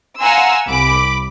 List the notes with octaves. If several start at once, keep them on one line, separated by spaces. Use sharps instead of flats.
F5 F#5 G#5 A#5 C6 E6
C2 B5 D6